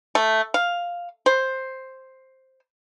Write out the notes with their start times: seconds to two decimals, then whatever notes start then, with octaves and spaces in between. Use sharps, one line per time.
0.15 A3
0.54 F5
1.26 C5